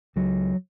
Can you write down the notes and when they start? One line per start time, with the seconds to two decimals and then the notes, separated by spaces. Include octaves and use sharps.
0.16 C#2 F#3